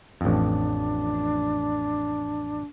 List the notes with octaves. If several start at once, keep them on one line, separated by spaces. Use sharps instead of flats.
A1 F2 D4